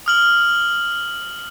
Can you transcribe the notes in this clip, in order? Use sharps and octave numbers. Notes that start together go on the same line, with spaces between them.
D#6 F6 F#7